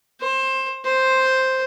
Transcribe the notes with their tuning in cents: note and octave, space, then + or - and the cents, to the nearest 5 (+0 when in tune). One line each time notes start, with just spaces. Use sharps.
C5 +20
C5 +0